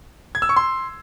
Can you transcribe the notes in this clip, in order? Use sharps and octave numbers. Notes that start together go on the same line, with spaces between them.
G#6
E6
C#6
C6